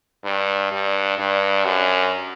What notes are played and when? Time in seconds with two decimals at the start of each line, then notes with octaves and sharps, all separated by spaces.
0.25 G2
0.72 G2
1.19 G2
1.65 F#2